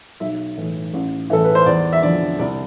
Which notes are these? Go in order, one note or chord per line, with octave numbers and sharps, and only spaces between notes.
B1 E5
A2 E3
A1
A2 E3 A4
B4
C5
E2 D5
E5
D3 F3 D5
C2 D5